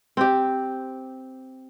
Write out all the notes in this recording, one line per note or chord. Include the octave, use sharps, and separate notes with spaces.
C4 G4